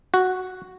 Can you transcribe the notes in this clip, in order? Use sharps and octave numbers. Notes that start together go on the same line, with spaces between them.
F#4